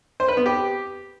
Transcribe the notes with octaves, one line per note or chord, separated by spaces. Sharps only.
C5
B4
B3
G4